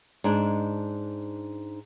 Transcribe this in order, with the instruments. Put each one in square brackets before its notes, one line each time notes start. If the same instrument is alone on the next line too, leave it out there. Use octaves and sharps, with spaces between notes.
[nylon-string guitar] G#2 D4